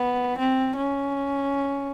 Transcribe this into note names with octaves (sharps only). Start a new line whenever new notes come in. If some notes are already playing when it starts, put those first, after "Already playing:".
Already playing: B3
C4
C#4